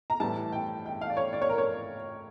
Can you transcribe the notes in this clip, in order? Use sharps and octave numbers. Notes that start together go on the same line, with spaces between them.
A#5
A2 E3 G3 A5
G5
G5
F5
D5
C#5
D5
C#5
A#4
C#5